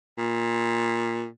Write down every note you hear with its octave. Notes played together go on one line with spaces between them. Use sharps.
A#2